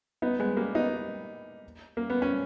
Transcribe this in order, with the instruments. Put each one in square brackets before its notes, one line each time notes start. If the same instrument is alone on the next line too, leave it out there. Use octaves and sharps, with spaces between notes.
[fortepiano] B3 D#4
G#3 B3
G3 A#3
B3 D#4
A#3
B3
C#4